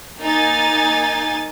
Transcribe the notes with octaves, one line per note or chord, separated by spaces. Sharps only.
A#3 D#4 G#5 A6